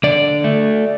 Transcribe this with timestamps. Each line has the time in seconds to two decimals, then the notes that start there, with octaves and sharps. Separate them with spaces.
0.03 D3 D5
0.44 A3